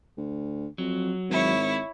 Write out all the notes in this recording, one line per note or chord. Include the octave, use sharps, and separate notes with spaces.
D2
F2 F#3
G#1 E4 C#5